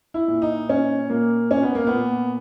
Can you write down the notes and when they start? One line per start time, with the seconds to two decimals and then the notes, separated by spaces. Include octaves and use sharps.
0.14 E4
0.28 A#2
0.42 D#4
0.69 A#2 C#4
1.10 A#2 A#3
1.51 A#2 C#4
1.63 B3
1.75 A#3
1.87 B3
1.92 A#2